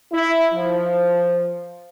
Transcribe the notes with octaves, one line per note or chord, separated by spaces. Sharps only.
E4
F3